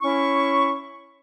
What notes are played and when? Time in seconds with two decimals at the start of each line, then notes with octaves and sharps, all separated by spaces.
0.01 C#4 E4 C#6